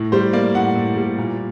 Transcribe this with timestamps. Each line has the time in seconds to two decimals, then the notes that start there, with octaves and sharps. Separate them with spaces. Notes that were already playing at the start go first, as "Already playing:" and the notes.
Already playing: A2
0.12 G3 C5
0.33 A#3 D5
0.55 A2 F#5
0.75 A2
0.96 G3
1.18 A#2